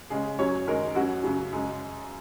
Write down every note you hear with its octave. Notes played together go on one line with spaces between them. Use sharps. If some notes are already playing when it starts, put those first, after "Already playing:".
C#3 G#3 C#4 G#4
F#2 F#3 C#4 C#5
F#2 D#3 G#3 C#4 A#4
F#2 F#3 C#4 F#4
F#2 C#3 F#3
F#2 C#3 G#3